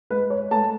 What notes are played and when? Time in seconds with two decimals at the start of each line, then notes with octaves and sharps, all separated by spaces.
0.10 G#3 B4
0.30 C#5
0.51 A3 A5